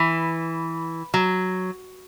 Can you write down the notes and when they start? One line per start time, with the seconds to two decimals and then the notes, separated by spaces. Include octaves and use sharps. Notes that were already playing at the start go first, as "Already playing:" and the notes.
Already playing: E3
1.14 F#3